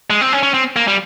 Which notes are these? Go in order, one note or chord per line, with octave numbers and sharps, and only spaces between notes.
G#3
C4
C#4
C#4
C4
A#3
G3